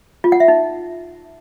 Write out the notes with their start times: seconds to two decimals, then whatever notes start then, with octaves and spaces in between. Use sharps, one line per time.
0.24 F4
0.32 F#5
0.40 E5
0.48 D#4